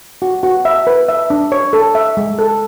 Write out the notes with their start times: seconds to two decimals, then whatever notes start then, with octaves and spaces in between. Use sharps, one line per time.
0.22 F#4
0.43 F#4
0.65 E5
0.87 B4
1.09 E5
1.30 D4
1.52 C#5
1.73 A4
1.95 E5
2.17 G#3
2.39 A4